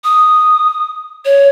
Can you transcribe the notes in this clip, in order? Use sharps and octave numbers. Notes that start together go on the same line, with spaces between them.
D#6
C#5